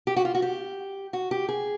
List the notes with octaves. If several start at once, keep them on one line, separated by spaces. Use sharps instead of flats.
G4
F#4
F4
F#4
G4
F#4
G4
G#4